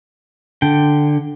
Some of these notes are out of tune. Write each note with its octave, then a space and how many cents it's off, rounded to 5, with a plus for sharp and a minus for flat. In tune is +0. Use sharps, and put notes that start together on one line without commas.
D3 +5 G5 +0